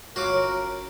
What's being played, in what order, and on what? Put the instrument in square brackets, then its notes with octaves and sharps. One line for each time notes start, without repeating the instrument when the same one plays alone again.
[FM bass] G1 [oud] C#4 F4 [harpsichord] F#4 D6 [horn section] A#4